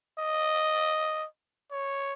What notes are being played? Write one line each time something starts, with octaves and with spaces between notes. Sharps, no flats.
D#5
C#5